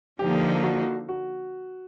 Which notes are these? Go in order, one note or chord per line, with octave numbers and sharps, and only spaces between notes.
D3 F3 A#3 D#4 G4
F#4
F#4